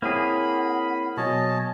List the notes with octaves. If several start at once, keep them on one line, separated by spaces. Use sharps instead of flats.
A#3 C4 E4 G#4 C#5 F#5 B5
B2 F#3 B3 C#5 D#5 G#5 A5